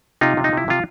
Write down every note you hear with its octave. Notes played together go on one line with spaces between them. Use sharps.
C3 D#4 F4
C3
D#4
C3 E4
C3 F4